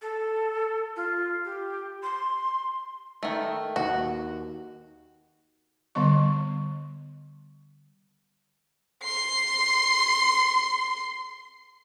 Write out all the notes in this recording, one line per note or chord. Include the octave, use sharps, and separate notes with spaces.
A4
F4
G4
C6
D#3 A3
D#2 F#4
D3 G3 B3 D#5 C#6
C6 C7